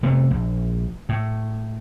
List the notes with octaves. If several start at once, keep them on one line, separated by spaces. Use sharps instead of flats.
C3 A3 B3
A#1
A2